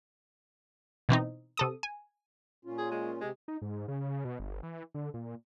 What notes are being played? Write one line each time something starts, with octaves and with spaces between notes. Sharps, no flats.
B2 E3 C4 D#4
C3 A4 D#6
G#5
A#2 C#4 F4
G#4
G#3
C3 G#3 G4
D#4
G#2
C#3
B2
G1
E3
D3
A#2